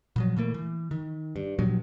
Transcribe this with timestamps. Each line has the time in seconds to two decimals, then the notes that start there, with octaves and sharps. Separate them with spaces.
0.16 A#2 F3 F#3
0.37 A#2 E3 A3 A#3
0.54 E3
0.91 D#3
1.36 G2
1.59 G2 A#2 F3 F#3